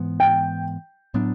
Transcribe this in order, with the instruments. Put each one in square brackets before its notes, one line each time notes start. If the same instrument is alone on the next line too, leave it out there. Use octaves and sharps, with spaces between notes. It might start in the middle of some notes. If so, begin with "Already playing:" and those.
Already playing: [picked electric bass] G#2 E3 G#3 B3
[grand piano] G5
[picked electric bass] A2 F#3 B3 D4